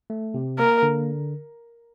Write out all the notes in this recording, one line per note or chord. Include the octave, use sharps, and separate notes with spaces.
A3
C3
A#3 A#4
D3